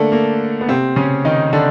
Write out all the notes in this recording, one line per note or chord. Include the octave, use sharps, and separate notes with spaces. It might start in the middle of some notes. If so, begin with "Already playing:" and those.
Already playing: D3 A3 A#3 D4
A#3
B3
C3 C4
C#3 C#4
D#3 D#4
D3 D4